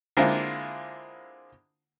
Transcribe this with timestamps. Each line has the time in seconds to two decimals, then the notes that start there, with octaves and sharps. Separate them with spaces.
0.17 D3 G#3 A#3 C4 E4 F4